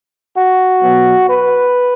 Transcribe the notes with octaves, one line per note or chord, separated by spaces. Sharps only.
F#4
B2 F#3 B3
B4